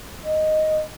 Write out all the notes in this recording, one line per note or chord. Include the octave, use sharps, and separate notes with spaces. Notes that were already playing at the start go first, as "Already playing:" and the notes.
D#5